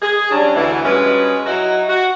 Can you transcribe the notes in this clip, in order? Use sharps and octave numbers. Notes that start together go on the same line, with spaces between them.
G#4
F#3 G3 C#4 D4
D2 B2 E3
G2 B2 G#3 C#4 B4
F#3 D#4 E4 F#4
F#4